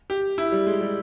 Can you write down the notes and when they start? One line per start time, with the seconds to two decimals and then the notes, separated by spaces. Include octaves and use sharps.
0.10 G4
0.38 E4
0.52 G3
0.66 G#3
0.81 G3